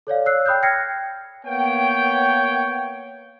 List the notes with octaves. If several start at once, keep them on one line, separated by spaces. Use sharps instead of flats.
A4 C#5 D5 F5
C#5 E6 F#6 C7
G5 B5 D#6 F#6 G6
G5 F6 G#6 A#6 C7 C#7
A#3 B3 C#5 G5